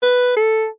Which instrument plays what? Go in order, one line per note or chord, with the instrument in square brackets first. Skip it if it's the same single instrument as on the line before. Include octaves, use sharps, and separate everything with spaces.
[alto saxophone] B4
A4